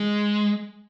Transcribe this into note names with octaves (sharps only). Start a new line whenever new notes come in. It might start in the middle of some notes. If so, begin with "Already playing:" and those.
Already playing: G#3